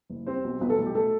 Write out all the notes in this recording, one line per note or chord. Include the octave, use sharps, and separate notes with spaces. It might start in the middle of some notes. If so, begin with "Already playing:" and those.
F#1
G3 C4 C5
B1
B1 B3 B4
A3 A4
B1
G3 G4
A3 A4